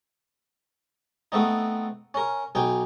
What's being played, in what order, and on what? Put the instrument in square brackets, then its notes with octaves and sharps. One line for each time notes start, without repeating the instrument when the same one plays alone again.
[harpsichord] A3 B3 C4 D#4
C#4 A#4
B1 D#4 G5 G#5